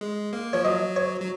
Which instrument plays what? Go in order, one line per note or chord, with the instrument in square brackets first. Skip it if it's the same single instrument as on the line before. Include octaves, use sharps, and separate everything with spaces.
[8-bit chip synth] G#3
A#3
[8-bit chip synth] F3 [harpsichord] C#5
[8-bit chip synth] F#3 [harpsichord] D#5
[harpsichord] C#5
[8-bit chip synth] F#3